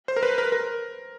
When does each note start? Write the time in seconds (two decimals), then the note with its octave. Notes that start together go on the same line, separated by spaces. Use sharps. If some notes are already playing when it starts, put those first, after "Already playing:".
0.08 C5
0.16 A#4
0.23 B4
0.38 A#4
0.52 A#4